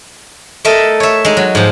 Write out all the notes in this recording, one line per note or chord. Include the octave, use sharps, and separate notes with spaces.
A3 A4 A#4 D#5 E5
C#5 E5
G#3 D#4
F#3
G#2 F3